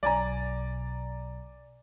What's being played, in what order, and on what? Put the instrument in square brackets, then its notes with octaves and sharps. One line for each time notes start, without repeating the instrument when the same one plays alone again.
[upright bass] B1 B2 [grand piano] D5 G#5 A#5